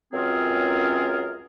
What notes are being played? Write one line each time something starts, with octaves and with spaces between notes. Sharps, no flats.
C#2 F#2 C4 F4 G#4 A#4